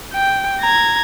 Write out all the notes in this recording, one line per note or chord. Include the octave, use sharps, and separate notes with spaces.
G5
A#5 G#6